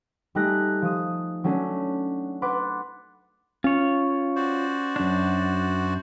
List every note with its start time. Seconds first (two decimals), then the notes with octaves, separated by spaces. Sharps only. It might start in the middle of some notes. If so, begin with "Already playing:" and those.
0.35 G3 A3 D#4 G#5 F#6 A#6
0.82 F3 D#6
1.44 F#3 A3 C#4 D4
2.42 B4 F#5 C6 D6 A6
3.64 C#4 F4 C#5
4.36 F#4 C5 D5
4.96 F#2 D4